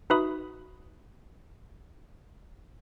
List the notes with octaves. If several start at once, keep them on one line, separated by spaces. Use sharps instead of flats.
D#4 F#4 B4 E5 B5 D#6